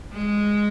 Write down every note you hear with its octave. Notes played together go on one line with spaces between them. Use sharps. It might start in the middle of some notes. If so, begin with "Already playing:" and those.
G#3